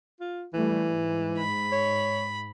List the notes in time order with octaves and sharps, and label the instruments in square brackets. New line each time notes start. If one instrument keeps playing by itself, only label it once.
[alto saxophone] F4
[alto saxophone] E3 [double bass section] G3 A3
[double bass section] G#2
[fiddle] B5
[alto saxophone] C#5